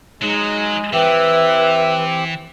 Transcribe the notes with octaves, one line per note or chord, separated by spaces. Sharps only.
F#3 G#3 D#4
E3 C4 G4 B4 E5